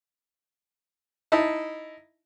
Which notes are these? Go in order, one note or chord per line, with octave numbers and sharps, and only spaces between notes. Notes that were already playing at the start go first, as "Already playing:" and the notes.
D#4 E4 A5